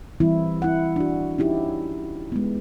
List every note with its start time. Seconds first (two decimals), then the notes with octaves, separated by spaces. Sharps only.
0.20 E3 G3 C4 E4
0.62 E4 F#5
0.96 D4 F#4
1.38 C#4 D#4 E4 G4
2.32 G#3 B3